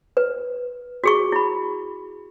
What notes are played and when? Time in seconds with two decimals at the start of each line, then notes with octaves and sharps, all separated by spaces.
0.17 B4
1.04 F#4 G#4 C#6
1.32 E4 B5